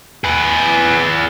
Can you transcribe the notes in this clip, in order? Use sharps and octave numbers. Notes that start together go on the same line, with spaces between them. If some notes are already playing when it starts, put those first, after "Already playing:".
G#4 B4